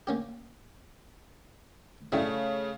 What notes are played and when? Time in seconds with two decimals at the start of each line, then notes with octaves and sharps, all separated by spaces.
0.07 A#3 C#4 G4
2.12 F#2 C#3 G3 A3 C#4 E4